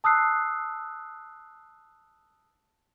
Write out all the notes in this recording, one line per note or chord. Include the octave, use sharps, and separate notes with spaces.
A5 D#6 E6 F#6 C7